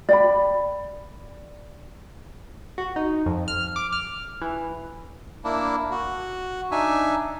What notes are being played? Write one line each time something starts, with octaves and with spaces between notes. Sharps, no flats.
D5 G5 B5
F#4
D#4
F2
F6
D6
F6
E3
A#3 D4 E4
F#4
D4 D#4 E5 G#5